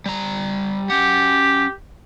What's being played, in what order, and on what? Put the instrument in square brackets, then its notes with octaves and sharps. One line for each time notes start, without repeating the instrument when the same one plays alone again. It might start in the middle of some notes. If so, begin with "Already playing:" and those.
[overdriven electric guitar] G3 A#5
[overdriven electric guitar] C#4 F#5 [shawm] G4